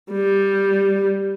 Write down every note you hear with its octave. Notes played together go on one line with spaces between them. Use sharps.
G3